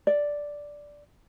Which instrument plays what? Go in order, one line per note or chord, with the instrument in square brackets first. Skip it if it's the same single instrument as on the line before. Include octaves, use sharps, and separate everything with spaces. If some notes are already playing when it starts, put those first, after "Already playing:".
[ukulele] D5